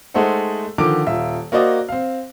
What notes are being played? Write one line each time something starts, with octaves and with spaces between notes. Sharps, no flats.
G#3 A3 D#4 A4 C5 F#5
D3 D#3 F3 D6 D7
D#1 F4 E5
A#3 F#4 C5 D5 D#5
C4 F5